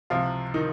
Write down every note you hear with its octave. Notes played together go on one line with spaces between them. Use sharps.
C#2 C3 F3 F4
D#3 D#4